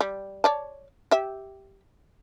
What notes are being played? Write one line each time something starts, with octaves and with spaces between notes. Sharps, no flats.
G3
C#5 D5 A5
G4 E5